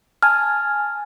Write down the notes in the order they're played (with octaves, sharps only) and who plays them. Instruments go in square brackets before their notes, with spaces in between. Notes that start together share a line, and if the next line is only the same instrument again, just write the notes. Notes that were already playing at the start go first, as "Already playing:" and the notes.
[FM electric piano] G#5 A5 [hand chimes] F6